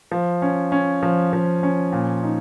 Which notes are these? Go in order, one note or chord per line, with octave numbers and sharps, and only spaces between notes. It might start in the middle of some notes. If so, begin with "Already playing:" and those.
F3
C#4
C#4
F3
F3
C#4
A#2
D#4